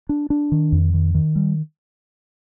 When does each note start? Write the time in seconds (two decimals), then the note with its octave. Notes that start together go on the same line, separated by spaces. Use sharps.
0.09 D4
0.30 D4
0.52 D#3
0.72 F2
0.94 D#3
1.14 D#3
1.36 G3